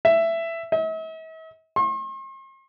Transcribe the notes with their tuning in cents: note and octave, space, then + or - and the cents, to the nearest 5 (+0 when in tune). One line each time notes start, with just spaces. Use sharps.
E5 +10
E5 -45
C6 +45